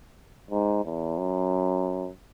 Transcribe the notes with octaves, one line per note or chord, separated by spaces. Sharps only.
G#2
E2
F#2